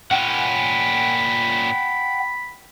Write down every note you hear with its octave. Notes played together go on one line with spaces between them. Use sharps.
A#2 C#4 F#5 G5 B5